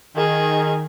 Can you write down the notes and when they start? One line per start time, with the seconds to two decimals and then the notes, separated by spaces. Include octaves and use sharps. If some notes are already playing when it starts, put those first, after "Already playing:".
0.17 D#3 G#4